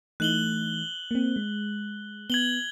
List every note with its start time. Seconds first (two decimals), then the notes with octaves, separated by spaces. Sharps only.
0.20 E3 A3 D#4 F#6 F#7 G7
1.11 A#3 C4
1.36 G#3
2.30 B3 G#6 F#7 G7